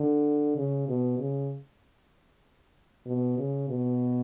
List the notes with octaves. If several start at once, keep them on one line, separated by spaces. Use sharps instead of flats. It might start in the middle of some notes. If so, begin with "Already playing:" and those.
Already playing: D3
C#3
B2
C#3
B2
C#3
B2